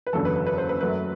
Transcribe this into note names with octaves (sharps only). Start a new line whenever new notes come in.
B4
F#1 E2 D3 F#3 A4
B4
B4
B4
C5
B4
F#2 F#3 A3 B4